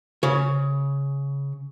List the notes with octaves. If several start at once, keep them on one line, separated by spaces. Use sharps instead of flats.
C#3 C#5